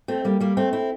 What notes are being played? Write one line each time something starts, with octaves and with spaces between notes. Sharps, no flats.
A3 C4
G3 A#3
G3 A#3
A3 C4
C4 E4